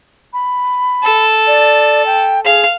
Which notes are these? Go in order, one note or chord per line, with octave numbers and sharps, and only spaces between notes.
B5
A4
D5
G5
G#4 F5